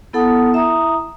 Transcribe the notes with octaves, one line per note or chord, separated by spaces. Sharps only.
B3 E4 A4 F#5 A5 D#6
E4 E5 A#5 D#6